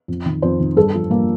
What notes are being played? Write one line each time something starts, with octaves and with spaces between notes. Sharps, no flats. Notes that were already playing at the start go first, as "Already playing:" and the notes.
F2
D#3
F2 C5
D#3
G2 A4
F3
G2 A#3